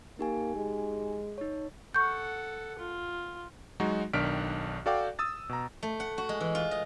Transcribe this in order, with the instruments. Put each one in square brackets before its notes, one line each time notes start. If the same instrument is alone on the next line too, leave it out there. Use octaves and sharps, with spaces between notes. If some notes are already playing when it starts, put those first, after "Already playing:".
[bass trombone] A#3 [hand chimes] D#4 G4 G#5
[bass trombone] G#3
[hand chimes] D#4 C#5
[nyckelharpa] A4 F#5 [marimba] C#6 G6
[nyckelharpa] F4
[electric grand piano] F#3 G#3 D#4 F#4
B1 D#3 D4 F6 B6 D7
F#4 A4 D5 F5 G5 D6
D#6 E6 A6
B2 A#5
[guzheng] A3
F#5
F#4
G#3
E3
F4
D#5